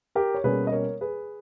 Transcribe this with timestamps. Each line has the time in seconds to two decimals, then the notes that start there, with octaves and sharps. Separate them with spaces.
0.15 G4 A#4
0.35 C#5
0.44 B2 G3 A#3 C#4 G#4 B4
0.67 D#5
0.72 A#4 C#5
1.01 G#4 B4